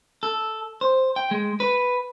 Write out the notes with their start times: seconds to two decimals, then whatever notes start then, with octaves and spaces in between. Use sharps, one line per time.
0.23 A4
0.81 C5
1.16 G5
1.31 G#3
1.60 B4